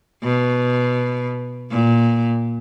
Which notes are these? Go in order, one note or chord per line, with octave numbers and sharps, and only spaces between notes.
B2
A#2